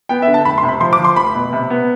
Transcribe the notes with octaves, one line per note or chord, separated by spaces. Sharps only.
B3 G5
E5
D3
A5
F1 B5
C6
C3
B5
F3 C6
D6
F3
C6
F1 B5
B2
C3
B3